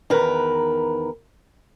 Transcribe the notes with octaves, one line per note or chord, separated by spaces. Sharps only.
E2 D#3 A#4 B4